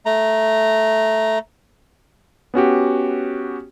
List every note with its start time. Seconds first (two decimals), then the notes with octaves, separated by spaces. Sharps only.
0.06 A3 A#5
2.54 B3 C#4 F#4 G4